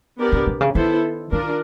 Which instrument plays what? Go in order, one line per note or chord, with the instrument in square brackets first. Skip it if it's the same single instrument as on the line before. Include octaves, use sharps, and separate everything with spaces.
[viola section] B3 D4 G4 A#4 D5
[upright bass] C3
C3
C#3
[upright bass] D#3 [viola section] B3 E4 A4 C5
[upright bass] D#3 [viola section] D4 F4 A#4